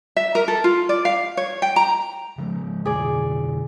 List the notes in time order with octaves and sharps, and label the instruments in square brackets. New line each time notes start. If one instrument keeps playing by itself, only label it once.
[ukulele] E5
A#4
A4
F4
D5
F5
C#5
G5
A#5
[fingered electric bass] C#3 F3 G#3
[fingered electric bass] F2 B2 D3 [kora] G#4 D5